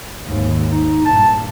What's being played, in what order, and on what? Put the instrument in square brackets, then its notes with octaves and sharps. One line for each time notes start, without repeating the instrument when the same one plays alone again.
[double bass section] D#2 G#2
[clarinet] D#4
[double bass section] A#1 G2 [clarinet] A5